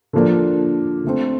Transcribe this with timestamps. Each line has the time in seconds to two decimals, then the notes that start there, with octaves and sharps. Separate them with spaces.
0.13 D3 F3 A#3 D4
1.04 D3 A3 C4